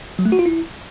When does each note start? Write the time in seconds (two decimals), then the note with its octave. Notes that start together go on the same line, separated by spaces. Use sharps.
0.19 F#3
0.26 A3
0.32 F#4
0.39 F4
0.46 E4